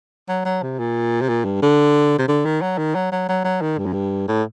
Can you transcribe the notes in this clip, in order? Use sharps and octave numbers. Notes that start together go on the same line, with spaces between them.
F#3
F#3
C3
A#2
C3
A#2
G2
D3
C3
D3
D#3
F#3
D#3
F#3
F#3
F#3
F#3
D#3
G2
F#2
G2
A2